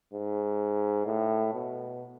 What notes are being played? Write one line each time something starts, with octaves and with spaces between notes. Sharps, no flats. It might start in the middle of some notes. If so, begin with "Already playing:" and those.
G#2
A2
B2